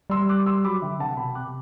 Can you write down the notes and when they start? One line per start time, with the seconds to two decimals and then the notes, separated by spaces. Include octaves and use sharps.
0.10 G3 C6 E6
0.29 D6 F#6
0.46 C6 E6
0.64 F#3 B5 D6
0.82 D3 E5 G5
0.99 C3 F#5 A5
1.17 B2 G5 B5
1.35 C3 D6 F#6